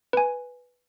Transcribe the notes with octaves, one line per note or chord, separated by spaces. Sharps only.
B4 G#5